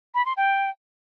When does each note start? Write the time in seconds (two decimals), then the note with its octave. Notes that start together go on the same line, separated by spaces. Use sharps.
0.15 B5
0.26 C6
0.37 G5